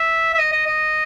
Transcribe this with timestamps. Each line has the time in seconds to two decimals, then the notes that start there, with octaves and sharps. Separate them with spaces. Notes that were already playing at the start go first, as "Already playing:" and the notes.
Already playing: E5
0.34 E5
0.39 D#5
0.52 D#5
0.67 D#5